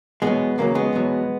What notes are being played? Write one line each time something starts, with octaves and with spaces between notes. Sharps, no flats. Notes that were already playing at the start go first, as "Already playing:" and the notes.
E2 B2 F#3 G#3 B3
E2 C#3 F#3 A#3
G#3 B3
E2 B2 F#3